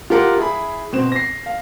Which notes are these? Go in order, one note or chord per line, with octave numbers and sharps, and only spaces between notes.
F4 G4 A#4 F#5
E4 G#4 B5
B2 C4 C5 E7
A#6 C7
F5